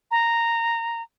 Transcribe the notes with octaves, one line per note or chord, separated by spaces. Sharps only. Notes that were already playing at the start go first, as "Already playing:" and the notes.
A#5